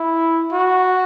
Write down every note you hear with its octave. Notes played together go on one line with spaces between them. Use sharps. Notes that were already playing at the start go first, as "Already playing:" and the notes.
Already playing: E4
F#4